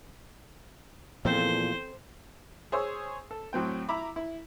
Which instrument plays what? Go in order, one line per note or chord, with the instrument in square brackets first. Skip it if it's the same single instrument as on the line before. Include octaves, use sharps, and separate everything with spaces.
[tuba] E2 [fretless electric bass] A#2 F3 [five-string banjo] C4 A4 [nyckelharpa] C5
[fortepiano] G#4 C5 C#5 E6
A4
A2 F#3 C4 G5
E4 E5 A#5 B5 D6
E4